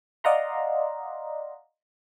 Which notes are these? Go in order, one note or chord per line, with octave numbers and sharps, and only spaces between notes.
D5 D#5 F5 F#5 A#5 C6